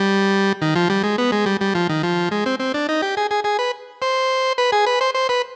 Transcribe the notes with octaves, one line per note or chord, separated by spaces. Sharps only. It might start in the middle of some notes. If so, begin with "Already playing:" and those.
Already playing: G3
D#3
F3
G3
G#3
B3
G#3
G3
G3
F3
D#3
F3
G#3
C4
C4
D4
D#4
G4
G#4
G#4
G#4
B4
C5
B4
G#4
B4
C5
C5
B4